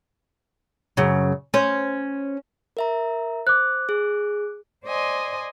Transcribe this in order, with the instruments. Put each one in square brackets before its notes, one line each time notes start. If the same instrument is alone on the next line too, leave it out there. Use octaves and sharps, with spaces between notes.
[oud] F#2 C#3
C#4 C5
[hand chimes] A#4 E5 A#5
[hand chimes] C5 [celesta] D6 F#6
[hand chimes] G#4
[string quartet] C5 D5 D#5 G#5 C6